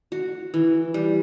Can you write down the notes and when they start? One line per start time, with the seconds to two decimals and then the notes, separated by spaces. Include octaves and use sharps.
0.12 F#4
0.54 E3
0.94 G3